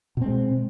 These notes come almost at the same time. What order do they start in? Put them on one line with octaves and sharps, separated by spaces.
B2 C4 G#3